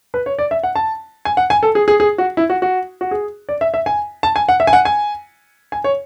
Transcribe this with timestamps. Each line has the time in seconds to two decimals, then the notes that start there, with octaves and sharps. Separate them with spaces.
0.14 B4
0.26 C#5
0.39 D5
0.51 E5
0.63 F#5
0.76 A5
1.25 G#5
1.37 F#5
1.50 G#5
1.63 A4
1.75 G#4
1.88 G#4
2.00 G#4
2.18 F#4
2.37 E4
2.50 F#4
2.62 F#4
3.01 F#4
3.11 G#4
3.49 D5
3.61 E5
3.74 E5
3.86 G#5
4.23 A5
4.36 G#5
4.49 F#5
4.60 E5
4.67 G#5
4.73 F#5
4.85 G#5
5.72 G#5
5.84 C#5